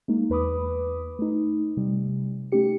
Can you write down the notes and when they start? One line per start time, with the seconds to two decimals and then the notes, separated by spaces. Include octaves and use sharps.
0.08 G#3 A#3 D#4
0.30 E2 B4 B5 D6 D#6
1.19 A3 D#4
1.77 C3 G3
2.52 A3 C#4 D#4 G4 C#7